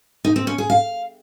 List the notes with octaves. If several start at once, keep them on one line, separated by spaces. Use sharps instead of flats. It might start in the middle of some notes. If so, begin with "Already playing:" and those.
D#4
C4
C#4
G#4
F5